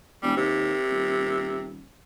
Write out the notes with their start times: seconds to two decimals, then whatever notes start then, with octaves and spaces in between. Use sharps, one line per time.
0.23 E1 G3
0.37 D#2 C3
0.90 D#1